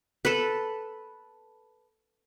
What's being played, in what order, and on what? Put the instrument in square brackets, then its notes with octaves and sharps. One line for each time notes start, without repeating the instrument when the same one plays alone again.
[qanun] A4 B4